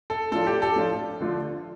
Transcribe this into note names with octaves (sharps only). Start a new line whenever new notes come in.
A4
A2 F3 D4 F4 A4
G4
A4
A2 F3 D4 F4
D3 F3 A3 F4